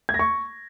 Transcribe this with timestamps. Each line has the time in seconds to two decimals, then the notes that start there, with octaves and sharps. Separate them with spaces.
0.09 G#6
0.14 A#6
0.19 C#6